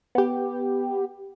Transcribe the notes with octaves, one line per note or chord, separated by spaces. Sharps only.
B3 G4